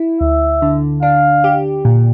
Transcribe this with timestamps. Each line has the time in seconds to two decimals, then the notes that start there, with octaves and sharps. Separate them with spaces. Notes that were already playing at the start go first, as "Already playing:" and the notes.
Already playing: E4
0.21 D2 E5
0.62 D3
1.03 D4 F5
1.44 G4
1.85 A#2